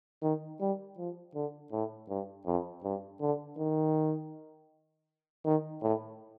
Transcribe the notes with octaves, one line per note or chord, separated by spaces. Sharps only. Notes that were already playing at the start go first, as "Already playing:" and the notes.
D#3
G3
F3
D3
A2
G2
F2
G2
D3
D#3
D#3
A2